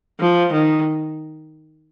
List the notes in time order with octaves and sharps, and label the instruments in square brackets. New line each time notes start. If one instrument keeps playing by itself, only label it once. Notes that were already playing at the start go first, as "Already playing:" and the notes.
[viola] F3
D#3